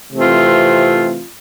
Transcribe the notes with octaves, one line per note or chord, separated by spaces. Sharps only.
C3 E3 A3 C4 F4